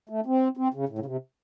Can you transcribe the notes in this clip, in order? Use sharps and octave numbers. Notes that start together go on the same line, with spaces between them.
A3
C4
C4
C#3
A2
C#3
C3